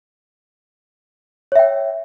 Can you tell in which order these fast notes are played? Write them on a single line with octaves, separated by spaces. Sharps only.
C#5 E5 G5